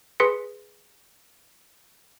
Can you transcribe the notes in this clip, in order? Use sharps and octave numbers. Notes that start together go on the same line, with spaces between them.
G#4 B4 C6 B6 C#7